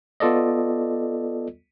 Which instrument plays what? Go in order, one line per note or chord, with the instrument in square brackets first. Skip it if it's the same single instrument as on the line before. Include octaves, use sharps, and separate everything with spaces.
[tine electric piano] B3 F4 A4 D5 D#5